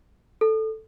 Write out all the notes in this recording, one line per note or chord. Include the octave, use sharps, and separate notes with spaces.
A4